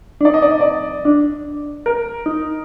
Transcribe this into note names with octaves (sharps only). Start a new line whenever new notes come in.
D4
D#4 D5
D#5
D5
D#5
D5
D4
A#4
D#4